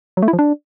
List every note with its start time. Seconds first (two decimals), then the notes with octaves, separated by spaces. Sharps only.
0.17 F#3
0.23 A3
0.28 E4
0.33 F3
0.39 D4